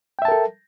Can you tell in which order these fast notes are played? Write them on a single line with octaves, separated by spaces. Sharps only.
G5 E5 A5 A#4 A4